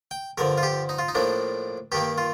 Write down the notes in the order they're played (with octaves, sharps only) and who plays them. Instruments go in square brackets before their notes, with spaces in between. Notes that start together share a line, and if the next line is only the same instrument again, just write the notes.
[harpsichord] G5
G2 D3 F3 A#4
F4
G4
D#4
F4
D#4
A2 F3 A#3 D4
G2 D#3 A#3 G4
F4